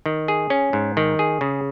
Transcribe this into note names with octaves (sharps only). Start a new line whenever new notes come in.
D#3
G#4
C#4
G#2
D#3
G#4
C#3